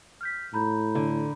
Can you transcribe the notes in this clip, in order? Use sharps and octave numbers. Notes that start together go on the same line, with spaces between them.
F6 G6 B6
A2 A#5 B5 G6
D3